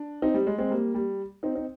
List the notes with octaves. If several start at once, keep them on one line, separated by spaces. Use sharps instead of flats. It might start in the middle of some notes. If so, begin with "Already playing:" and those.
Already playing: D4
C4 D#4
G3
G#3
G#3 C4
G3 A#3
G3
C4 D#4
C4 D#4